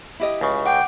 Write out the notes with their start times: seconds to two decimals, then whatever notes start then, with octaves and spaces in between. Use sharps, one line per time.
0.20 E4 G4 D#5
0.41 C#2 C#3
0.66 F#5 G5 D6 D7